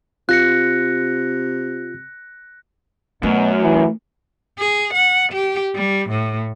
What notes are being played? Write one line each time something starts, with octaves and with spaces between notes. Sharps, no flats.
C3 F4 F#6 A#6 C#7
F#2 B2 A3
E3
G#4
F#5
G4
G3
A2